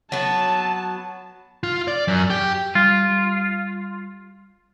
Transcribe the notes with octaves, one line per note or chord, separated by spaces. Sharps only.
F#3 B3 A5
F4
D5
F#2
G4
G3 F4